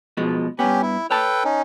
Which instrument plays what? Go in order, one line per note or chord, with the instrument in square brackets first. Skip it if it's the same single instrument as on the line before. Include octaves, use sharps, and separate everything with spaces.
[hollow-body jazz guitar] B2 F3 G#3
[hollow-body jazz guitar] G2 B3 [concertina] C#4 G4
[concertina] E4
[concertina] A4 B4 G5 [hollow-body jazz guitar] C#5 A5
[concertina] C#4 D#4